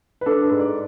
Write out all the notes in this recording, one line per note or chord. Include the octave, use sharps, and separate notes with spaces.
B4
D4 A4
B4
G#2
D5